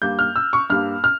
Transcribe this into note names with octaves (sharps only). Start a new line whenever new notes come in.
G2 G3 A#3 G6
F6
E6
C#6
G2 G3 A#3 F6
F6